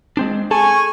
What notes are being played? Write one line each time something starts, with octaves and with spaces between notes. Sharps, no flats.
G#3 C4 D4
G#4 A4 G#5 A5 C#6